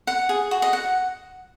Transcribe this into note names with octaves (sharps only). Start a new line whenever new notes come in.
F#5
G#4
F#4
D#5
F#5